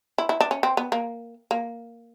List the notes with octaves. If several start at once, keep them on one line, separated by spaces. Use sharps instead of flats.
E4
E4
D4
C#4
C4
B3
A#3
A#3